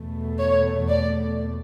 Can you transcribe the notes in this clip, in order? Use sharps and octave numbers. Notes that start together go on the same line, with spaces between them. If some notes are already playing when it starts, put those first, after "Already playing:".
Already playing: E2 B2 A3
C#5
D5